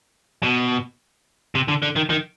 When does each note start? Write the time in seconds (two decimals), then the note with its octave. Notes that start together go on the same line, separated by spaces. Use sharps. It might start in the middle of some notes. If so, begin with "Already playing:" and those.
0.43 B2
1.55 C3
1.68 D3
1.82 D3
1.96 D#3
2.10 D#3